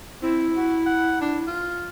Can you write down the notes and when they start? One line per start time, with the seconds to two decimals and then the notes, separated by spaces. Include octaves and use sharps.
0.22 C4 E4
0.57 F#4
0.86 F#5
1.21 D4
1.47 F4